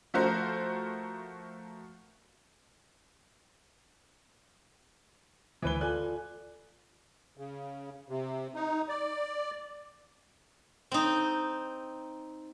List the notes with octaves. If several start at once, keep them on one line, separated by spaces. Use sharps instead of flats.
F3 A3 F#4 A#4 C5
D2 D3 E3 B4 G7
F4 A4 D5 G#5 F#6
C#3
C3
D#4
D5
C4 D#4